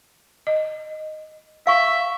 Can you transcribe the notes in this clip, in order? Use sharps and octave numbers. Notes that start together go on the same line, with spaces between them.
D#5
E5 F5 C#6